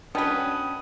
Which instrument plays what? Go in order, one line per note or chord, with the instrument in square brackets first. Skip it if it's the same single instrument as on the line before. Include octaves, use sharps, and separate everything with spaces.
[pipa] B2 B3 [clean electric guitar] C#4 B4 [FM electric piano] D4 G5 A5 [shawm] D#6